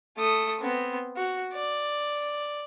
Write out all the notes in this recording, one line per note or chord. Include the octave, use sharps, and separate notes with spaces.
A3 D#6
B3 C4
F#4
D5